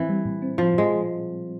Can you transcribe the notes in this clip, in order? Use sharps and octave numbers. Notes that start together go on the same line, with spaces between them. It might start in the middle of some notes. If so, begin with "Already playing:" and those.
Already playing: E3 C4
G3
A#2
C4
A#2 F3
A#2 G#3